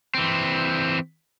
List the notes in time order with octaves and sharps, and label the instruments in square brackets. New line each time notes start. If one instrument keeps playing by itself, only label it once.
[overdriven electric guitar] E3 C4